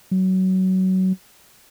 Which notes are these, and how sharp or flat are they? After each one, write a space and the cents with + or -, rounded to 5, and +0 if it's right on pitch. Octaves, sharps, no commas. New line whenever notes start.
F#3 +20